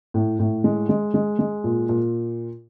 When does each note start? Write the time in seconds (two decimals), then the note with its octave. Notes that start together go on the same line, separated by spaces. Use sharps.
0.14 A2
0.39 A2
0.64 G#3
0.89 G#3
1.14 G#3
1.39 G#3
1.64 A#2
1.89 A#2